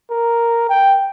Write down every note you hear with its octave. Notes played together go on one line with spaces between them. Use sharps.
A#4
G5